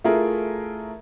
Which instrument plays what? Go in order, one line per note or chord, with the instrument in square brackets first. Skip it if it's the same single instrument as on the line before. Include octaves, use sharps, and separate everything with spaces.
[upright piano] A3 E4 F4 G#4 A#4